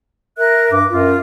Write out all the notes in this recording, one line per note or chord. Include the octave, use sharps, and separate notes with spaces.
A#4 E5 F#6
G2 D6
F#2 F4